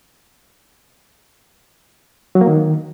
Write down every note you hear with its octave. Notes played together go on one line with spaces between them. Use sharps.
F#3
A#3
D#3